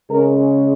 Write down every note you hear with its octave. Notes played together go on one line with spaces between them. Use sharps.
C#3 G#3 C#4 A#4